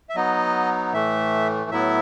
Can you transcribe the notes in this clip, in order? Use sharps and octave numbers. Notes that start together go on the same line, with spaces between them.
E5
F#3 B3 D#4 D#5
A2 E3 A3 E5
A2 F#3 B3 E4 E5